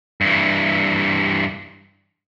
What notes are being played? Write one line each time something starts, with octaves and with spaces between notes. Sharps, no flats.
G2 E3